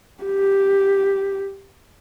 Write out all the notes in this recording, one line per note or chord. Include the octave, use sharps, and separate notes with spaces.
G4